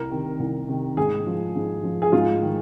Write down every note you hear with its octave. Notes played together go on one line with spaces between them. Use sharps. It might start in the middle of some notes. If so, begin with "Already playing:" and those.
Already playing: C2 A#4
C3 D#3
C2
C3 D#3
G#2 G#4
F3
G#2
F3
G#4
G#2 F4
D#3